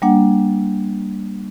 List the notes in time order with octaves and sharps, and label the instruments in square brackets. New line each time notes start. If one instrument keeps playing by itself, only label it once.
[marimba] G3 A#3 D4 F#5